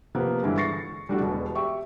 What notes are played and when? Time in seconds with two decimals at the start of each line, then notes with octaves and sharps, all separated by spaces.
0.15 C3 F3 A#3 B3
0.43 G2 D3 E3 G#3 E4
0.57 C#6 A6 A#6 C7 C#7
1.09 G3 A3 D4 E4 F#4 G4
1.20 E1 B2
1.55 G4 E5 C#6